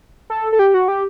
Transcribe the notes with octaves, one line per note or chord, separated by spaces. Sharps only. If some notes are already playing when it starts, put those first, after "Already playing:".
A4
A4
G4
F#4
G4